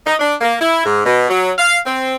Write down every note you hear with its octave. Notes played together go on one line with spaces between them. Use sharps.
D#4
D4
A#3
E4
G#2
B2
F#3
F5
C4